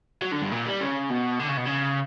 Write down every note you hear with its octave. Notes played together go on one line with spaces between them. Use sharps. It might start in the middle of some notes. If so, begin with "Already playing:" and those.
F#3
D3
G2
A#2
G3
C#3
B2
D3
C#3
B2
C#3